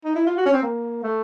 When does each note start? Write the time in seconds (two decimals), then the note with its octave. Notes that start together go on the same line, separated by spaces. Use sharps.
0.04 D#4
0.15 E4
0.27 F4
0.37 F#4
0.46 C#4
0.54 C4
0.62 A#3
1.03 A3